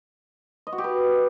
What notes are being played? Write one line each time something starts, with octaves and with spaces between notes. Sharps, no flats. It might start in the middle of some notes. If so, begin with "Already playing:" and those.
D#5
F#4
G4
B4